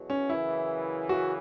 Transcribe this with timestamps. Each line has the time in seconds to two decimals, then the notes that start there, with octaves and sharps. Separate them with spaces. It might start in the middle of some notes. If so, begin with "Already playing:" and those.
Already playing: E2 B2 F#3
0.10 C#4
0.29 F#2 C#3 E3 E4
1.09 F#4